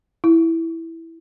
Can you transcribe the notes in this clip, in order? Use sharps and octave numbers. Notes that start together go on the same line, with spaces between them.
E4